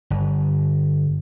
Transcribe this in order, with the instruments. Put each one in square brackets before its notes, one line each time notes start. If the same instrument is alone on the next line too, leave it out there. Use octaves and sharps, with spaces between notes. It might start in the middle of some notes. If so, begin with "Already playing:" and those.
[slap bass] G1